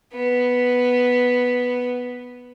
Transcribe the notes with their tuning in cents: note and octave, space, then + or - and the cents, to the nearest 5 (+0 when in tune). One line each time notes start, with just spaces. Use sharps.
B3 +0